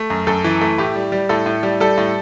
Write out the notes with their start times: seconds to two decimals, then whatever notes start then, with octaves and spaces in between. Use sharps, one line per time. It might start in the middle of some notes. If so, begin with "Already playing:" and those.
Already playing: A3
0.10 F#2
0.27 F#2 A4
0.44 E3
0.61 A3
0.78 A2 G4
0.95 G3
1.12 G3
1.29 A2 A4
1.46 A2
1.63 G3
1.80 G3 A4
1.97 A2